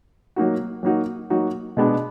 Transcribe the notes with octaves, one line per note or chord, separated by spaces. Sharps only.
F#3 A#3 D#4 F#4
F#3 A#3 D#4 F#4
F#3 A#3 D#4 F#4
B2 G#3 B3 D4